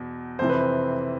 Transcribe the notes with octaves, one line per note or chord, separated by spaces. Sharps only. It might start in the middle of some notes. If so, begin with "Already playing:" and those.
Already playing: E2 B2
F2 C3 E3 C5
B4
C5